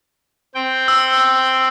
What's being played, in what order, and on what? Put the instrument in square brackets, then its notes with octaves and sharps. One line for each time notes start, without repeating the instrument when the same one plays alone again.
[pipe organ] C4 G5
[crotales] E6